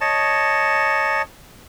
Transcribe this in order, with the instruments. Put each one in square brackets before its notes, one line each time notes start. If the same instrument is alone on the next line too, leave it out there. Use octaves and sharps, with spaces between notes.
[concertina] C#5 D#5 A5